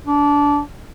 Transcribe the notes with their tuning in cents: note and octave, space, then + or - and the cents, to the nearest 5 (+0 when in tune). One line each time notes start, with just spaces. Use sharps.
D4 -20